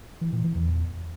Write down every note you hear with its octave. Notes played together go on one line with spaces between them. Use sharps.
E3
A#2
E3
E2